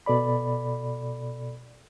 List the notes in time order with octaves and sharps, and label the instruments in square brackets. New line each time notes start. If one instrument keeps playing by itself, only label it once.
[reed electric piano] B2 A4 D5 B5